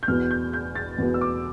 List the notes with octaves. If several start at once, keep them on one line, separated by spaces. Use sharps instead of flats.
G6
E2 B2 B3 F6
G6
G6
A6
E2 B2 B3
E6
D6